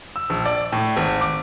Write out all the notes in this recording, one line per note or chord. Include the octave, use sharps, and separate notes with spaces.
E6
A#1
D5
A2
G#1
D6